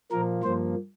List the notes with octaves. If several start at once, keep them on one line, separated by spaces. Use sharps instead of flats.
A#2 F3 A#3 A#4
G2 F3 A#3 C5